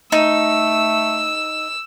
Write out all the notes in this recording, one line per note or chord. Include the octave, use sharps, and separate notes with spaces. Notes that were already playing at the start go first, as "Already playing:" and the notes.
A3 D#4 E6